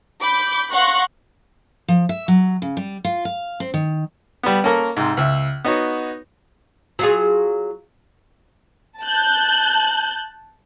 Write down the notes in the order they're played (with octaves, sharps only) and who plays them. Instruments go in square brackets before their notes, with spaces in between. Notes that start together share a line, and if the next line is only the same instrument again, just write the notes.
[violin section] B5 D6 G6
F5 F#5 C6 C#6 F#6 A#6
[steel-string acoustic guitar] F3
E5
F#3
C#3
G3
F4
F5
C4
D#3
[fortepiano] G3 B3
A#3 C#4 A4 A#4
G#2 C3
C#2 E5
B3 D#4 F#4 C#5
[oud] F#3 F4 G#4
[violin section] A5 F#6 G6